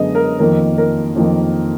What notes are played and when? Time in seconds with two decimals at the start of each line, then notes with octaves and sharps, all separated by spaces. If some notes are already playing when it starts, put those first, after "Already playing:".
Already playing: F#2 D3 G#3 B3 D#5
0.15 A#4
0.39 F2 D#3 A#3 A#4
0.78 A#4
1.16 F2 D#3 A#3